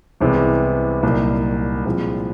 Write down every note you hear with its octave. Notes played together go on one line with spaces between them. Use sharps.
C2 C3 E3 G#3 B3
C2 A#2 F#3 A#3 D#4
C2 A#2 F3 G#3 C4